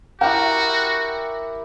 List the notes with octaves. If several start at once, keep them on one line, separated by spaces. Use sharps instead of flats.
E4 F#4 G4 A#4 G5